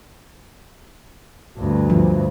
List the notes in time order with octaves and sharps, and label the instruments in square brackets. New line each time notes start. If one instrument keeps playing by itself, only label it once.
[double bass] D2 G2
[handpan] F3